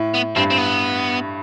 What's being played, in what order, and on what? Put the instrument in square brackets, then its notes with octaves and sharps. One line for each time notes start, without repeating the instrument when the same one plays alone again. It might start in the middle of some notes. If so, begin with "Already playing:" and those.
Already playing: [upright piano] A2
[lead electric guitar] B3
[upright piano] G2 [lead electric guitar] C4
[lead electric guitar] C4
B3